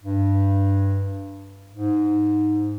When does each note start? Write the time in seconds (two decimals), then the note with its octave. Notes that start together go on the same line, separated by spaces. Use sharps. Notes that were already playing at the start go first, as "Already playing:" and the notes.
0.04 G2
1.73 G#2